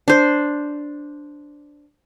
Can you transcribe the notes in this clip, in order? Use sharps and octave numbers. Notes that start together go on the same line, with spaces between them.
D4 C5